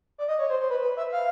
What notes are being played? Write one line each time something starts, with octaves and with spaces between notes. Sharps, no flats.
D5
D#5
C#5
C5
C5
B4
B4
E5
F5